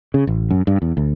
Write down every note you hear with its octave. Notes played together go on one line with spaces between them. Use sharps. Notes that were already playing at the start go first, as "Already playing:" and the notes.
C#3
A1
F#2
G2
E2
D2